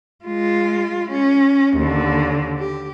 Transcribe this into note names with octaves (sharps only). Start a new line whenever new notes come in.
G#3 F4
C#4
D#2 D3
G4